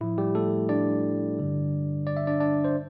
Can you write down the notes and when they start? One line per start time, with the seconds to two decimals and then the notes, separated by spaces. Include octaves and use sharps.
0.01 A2 F3 E4
0.18 G3 G4
0.35 A3 A4
0.69 D4 D5
1.38 G2 D3 G3
2.07 D5
2.17 E5
2.27 D4 D5
2.40 D4 D5
2.64 C5